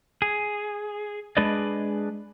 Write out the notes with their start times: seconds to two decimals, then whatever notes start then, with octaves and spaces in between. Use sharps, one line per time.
0.22 G#4
1.37 G#3 D4 G#4 B4 D5 D#5